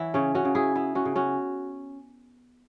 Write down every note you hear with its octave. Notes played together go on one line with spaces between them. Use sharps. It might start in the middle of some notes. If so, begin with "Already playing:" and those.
Already playing: E3 E4 C#5 F#5
C#3 C#4
C#4 F#4
C#3
E4 G#4
B3 E4
C#4 F#4
C#3
C#4 F#4